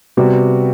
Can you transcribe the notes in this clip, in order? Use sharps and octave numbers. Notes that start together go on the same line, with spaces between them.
C3 G3 B3 F#4